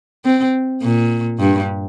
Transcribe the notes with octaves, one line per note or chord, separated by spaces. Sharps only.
C4
A#2
G2